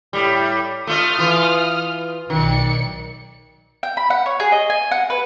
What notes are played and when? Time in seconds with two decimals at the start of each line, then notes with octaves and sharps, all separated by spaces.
0.13 A2 G3
0.87 A3 F4 D#5 D#6 F6
1.18 E3 F4
2.30 B1 D#3 D5 C#7
3.83 G5
3.97 B5
4.10 F#5
4.26 C#5
4.40 G#4
4.52 D#5
4.70 G#5
4.91 F#5
5.10 B4